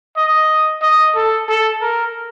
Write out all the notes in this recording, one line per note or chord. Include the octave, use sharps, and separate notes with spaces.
D#5
D#5
A4
A4
A#4